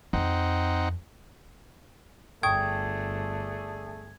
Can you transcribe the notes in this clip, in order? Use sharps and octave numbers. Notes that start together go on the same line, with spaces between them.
F2 C4 D#4 F#5
G1 A3 D4 G#4 G5 C#6 D#6 G#6